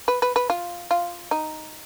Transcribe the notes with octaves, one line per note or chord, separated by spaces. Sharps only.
B4
B4
B4
F4
F4
D#4